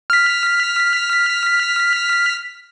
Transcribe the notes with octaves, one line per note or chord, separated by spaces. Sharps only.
F6 B6